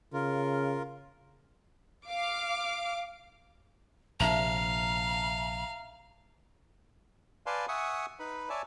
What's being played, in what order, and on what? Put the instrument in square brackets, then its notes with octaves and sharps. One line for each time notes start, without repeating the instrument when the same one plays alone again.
[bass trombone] C#3 [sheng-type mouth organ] F4 A#4
[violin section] F5 D6
[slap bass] A#1 C3 [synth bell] E5 A5 [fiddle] F5 [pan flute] A#5
[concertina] B4 D5 F5 G#5 A5 C6
E5 F#5 G#5 C#6 D#6
D#4 B4 B5
C#5 D5 E5 G#5 A5